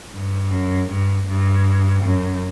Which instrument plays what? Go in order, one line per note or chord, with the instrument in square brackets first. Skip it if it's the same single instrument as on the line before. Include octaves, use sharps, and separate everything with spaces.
[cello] G2
F#2
G2
G2
F#2